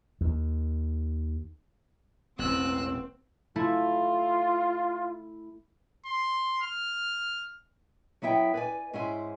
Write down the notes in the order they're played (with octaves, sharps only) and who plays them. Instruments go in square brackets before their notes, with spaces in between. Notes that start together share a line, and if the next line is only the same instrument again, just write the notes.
[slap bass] D#2
[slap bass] E1 A1 [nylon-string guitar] B3 [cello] C4 [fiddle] E6 F#6
[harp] A3 E4 [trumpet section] F4
[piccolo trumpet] C6
F6
[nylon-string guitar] F#3 B3 E4 E5 G5
B4 D5 G#5
G#2 C#4 E4 C5 G#5